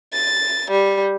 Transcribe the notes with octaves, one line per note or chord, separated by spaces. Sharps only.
A6
G3